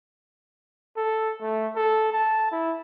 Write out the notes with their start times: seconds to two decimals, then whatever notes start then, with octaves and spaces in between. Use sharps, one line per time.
0.96 A4
1.41 A3
1.76 A4
2.13 A5
2.51 E4